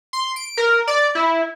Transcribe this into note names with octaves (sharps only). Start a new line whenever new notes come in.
C6
D7
A#4
D5
E4